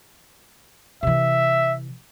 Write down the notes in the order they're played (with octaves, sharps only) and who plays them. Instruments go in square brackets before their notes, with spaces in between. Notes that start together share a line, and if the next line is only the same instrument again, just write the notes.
[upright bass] C3 E3 [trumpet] E5